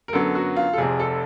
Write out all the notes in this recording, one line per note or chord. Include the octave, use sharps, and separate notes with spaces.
A#4
F#2 D3 F#3 B3 A4
F#4
F4
A4
F1 F2 C3 G#4
A4